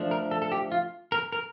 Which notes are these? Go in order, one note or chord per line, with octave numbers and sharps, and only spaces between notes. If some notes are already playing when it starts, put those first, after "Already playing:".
Already playing: F3 A3 D4
A#4
A4
A4
G4
F4
A#4
A#4